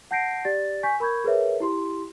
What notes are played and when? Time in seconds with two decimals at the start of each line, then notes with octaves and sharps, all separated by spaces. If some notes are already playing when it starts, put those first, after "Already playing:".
0.11 F#5 A5 G6 A#6 C7 D7
0.45 G4 D5 A6
0.83 G#5 C#6 G6 B6
1.00 A#4 B5 C#6 G6 G#6
1.24 G#4 A#4 B4 C#5 E5
1.60 E4 G4 C6